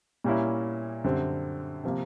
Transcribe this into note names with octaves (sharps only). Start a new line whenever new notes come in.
A#2 G3 A#3 C#4 E4
F#2 D3 G3 C4
C3 F3 A#3